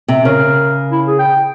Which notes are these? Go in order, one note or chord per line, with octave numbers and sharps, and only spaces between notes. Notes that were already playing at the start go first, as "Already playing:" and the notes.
C3
C#3 A#4
E4
G#4
G5